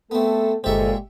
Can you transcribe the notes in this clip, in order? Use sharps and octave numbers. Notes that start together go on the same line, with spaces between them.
A3 B3 C4 A4
G1 A#2 G#3 G4 A4 C5 E5 C#6